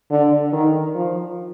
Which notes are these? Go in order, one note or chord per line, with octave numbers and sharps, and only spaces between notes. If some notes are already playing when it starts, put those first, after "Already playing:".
D3
D#3
F3